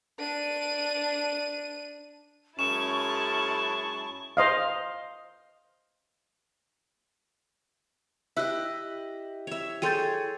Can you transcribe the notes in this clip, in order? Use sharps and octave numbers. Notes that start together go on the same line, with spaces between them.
D4 D#7
F#2 G#3 C#4 E4 A5 C#6 E7
C5 D#5 F5
E4 G4 D#5 E5 E6 F#6
C#5 E5
G#4 A4 C#5 G5 C6 G6 A6 D#7